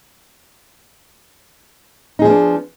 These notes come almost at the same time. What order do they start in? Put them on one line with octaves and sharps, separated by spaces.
D#4 G#4 F3 B3 D4